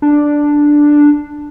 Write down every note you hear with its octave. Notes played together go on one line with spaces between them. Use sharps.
D4